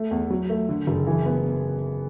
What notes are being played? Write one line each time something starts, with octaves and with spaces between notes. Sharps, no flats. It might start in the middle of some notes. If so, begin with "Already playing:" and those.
Already playing: A3
E2
F#3
A3
D3
F#1
E3
B3